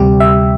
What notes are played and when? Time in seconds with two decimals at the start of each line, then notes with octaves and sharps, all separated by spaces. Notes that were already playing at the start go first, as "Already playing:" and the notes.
Already playing: D2 C3 G3 G4
0.20 E5